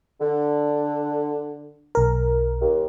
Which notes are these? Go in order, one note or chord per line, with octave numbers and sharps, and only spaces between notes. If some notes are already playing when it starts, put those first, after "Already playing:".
D3
B1 A#4
D#2